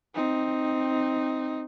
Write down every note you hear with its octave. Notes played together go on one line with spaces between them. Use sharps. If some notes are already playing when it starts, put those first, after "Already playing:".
C4 D#4